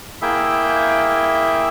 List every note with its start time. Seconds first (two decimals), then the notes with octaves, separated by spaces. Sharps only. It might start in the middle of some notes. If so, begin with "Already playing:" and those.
0.22 A#3 E4 G#4 E5 G5